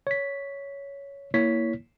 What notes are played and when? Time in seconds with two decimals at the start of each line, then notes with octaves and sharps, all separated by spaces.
0.07 C#5 B6
1.34 A#3 E4 C#5 B6